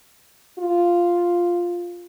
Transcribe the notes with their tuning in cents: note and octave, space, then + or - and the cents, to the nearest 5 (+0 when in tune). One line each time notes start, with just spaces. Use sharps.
F4 +0